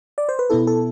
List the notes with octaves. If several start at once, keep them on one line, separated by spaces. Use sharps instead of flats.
D5
C5
B4
B2 B3 E4 A4
A4